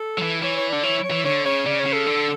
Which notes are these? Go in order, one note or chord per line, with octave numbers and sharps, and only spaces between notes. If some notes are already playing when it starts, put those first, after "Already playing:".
Already playing: A4
F#3
E3
E3 C#5
C#5
D3 D5
E3 C#5
C#5
E3
D3 C#5
C#3 C#5
C#3 D5
C#5
C#3
A4
D3